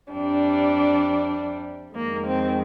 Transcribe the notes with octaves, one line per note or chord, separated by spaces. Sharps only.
F2 C3 G3 D4
F2 D#3 G#3 A#3
C4